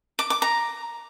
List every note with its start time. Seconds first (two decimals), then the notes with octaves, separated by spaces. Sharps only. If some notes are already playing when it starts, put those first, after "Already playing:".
0.19 D6
0.30 D6
0.42 A#5